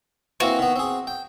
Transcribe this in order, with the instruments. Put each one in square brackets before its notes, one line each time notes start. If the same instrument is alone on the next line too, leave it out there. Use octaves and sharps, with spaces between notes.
[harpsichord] E3 A#3 C4 [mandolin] F#4
[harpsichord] D#3 B3
C4 G#4
G5